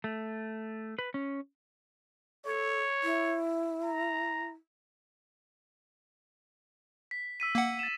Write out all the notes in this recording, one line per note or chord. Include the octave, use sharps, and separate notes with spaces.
A3
B4
C#4
A4 C#5
E4
A#5
B6
E6 B6 D#7
A#3 F#5
A6 E7